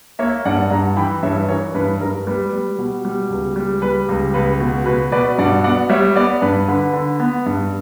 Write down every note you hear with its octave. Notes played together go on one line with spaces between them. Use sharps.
A#3 C#5 E5
G2 D5 F#5
G2 F#5 A#5
E3 G5 B5
G2 C#5 E5
B4
E3 A#4 C#5
G2 B4
G2 A#4
G3 B4
G3
B2
G3
C#2
G3
G3 B4
C#2
C#2 B4
B2
B2 B4
B2 B4 D5
G2 D5 F#5
B3 D5 F#5
G3 C#5 E5
B3 B4 D5
G2 B4
D3 B4
D3
B3
G2